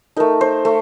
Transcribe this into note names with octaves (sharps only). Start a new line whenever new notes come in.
A3 D#4 A#4
C5
A3